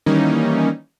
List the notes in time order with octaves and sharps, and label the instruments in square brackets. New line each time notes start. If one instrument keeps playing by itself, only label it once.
[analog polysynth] D#3 E3 G3 A#3 C#4 D#4